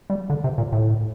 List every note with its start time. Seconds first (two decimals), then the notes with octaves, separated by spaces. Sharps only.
0.10 G3
0.30 D3
0.44 C3
0.58 A#2
0.72 A2